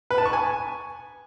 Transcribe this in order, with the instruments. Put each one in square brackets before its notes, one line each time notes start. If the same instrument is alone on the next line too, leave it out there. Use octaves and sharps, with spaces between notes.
[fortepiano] B4
A5
C#6
G#5